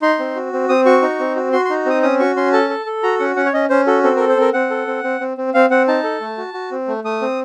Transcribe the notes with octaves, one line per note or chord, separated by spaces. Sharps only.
D#4 C6
C4
F#4
C4
C4 D#6
F#4 C#6
D#4
C4
F#4
F#4 C6
C6
D#4
C4 D#6
C#4 D#6
F#4 C#6
C#4 C6
A4 A5
A4
A4
F#4 A#5
C#4 F#5
C#4 F#5
C#5
C#4 D#5
C#4 C5
F#4 A4
C4 A4
A4 A#4
C5
C4 A#4
C4 F#5
A4
C4
C4
C4
C4
C4 F5
C4 F#5
D#4 A5
A4
A3
F#4
F#4
C4
A3
A3 D#6
C4